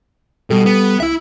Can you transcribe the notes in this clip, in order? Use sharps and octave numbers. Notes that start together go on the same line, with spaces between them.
B2 G3 G4 A4
B3
C2 E4 E5